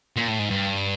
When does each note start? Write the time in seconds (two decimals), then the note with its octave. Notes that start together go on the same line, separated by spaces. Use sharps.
0.16 A#2
0.27 A2
0.39 G#2
0.50 G2